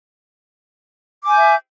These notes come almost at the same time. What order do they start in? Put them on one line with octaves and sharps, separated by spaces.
D6 G#5 G6 E5